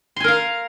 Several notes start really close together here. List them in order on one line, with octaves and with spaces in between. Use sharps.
C6 G#5 A#4 F5